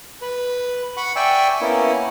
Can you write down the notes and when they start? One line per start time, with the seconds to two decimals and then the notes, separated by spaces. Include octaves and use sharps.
0.22 B4
0.97 F#5 B5 C#6
1.16 D5 E5 G5 G#5 C#6 E6
1.61 A#3 B3 C#4 E4